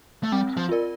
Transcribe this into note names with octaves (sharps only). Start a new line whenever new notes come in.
A3
G3 C4
F3
F4 A#4 D5